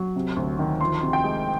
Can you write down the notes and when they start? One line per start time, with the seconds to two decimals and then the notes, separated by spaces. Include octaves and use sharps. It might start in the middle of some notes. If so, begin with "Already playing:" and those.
Already playing: F#3
0.16 C3
0.36 D2
0.59 D#3
0.81 F3 C6
1.03 C3
1.13 G5
1.24 G#3